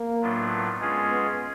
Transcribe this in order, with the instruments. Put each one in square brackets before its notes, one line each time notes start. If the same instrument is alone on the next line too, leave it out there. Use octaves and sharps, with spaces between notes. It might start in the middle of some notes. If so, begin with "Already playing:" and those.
Already playing: [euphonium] A#3
[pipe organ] A2 F#3 B3 D4 F4
[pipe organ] G#3 C#4 F4 G#4 [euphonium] B3
[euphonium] B3